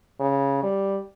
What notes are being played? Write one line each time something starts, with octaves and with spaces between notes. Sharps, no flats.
C#3
G3